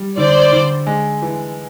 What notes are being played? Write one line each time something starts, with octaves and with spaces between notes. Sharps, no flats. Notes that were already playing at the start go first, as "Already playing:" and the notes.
Already playing: G3
D3 C5 D5
D3
G#3
E3